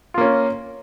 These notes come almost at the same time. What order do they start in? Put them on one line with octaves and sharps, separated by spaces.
F4 A#3 C#4